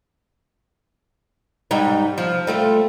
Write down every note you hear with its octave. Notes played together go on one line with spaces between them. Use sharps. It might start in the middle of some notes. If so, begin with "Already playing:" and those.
G#2 G3 D#4
F3
G3 A3 F4